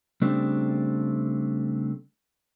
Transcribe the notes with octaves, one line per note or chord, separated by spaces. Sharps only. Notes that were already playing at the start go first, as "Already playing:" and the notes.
C#3 G3 A3 C4 D4